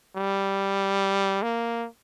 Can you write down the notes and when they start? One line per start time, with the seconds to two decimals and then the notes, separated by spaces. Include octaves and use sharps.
0.16 G3
1.43 A#3